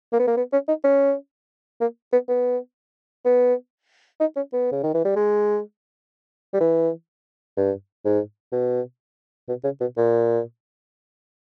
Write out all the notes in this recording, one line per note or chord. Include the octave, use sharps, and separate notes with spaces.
A#3
B3
A#3
B3
C#4
D#4
C#4
A#3
B3
B3
B3
D#4
C#4
B3
C#3
D#3
E3
G3
G#3
G3
E3
G2
G#2
B2
B2
C#3
B2
A#2